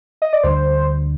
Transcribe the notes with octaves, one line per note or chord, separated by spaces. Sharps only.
D#5
D5
D2 D3 G3 C5